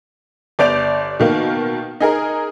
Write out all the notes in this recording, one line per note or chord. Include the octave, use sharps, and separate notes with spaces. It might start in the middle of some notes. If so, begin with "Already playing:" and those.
G1 D5 G6 D7 F7
B2 D#3 A#3
D#4 G#4 A#4